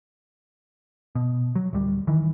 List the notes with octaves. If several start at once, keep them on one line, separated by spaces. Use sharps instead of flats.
B2
F#3
D1 G3
D#3 E3